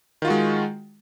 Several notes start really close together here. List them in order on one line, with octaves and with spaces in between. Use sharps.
D#3 F4 F#4 G#3